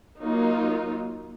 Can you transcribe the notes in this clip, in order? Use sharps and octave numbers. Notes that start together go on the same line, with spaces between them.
F#3 A#3 D#4 F4